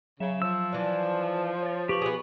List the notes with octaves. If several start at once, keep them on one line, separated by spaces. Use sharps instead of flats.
C#3 F#3 E5 E7
F3 E6
E3 D4
C#5 A6
G4 B4 C#6 F#7
B3 G#4